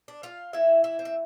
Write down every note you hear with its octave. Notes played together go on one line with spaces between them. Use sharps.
D4
F4 F5
E3 E4 E5
E4 E5
C4
E5